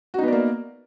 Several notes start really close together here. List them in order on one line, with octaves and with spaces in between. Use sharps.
F#4 D#4 B3 D5 A#3